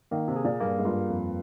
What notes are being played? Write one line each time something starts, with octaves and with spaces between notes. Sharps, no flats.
D#3 A#3
C3
G#4
A#2
G2 A#3
G#2
G2 F4
F2